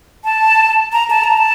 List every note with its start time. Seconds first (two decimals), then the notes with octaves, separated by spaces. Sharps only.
0.24 A5
0.93 A#5
1.10 A5
1.24 A#5
1.38 A5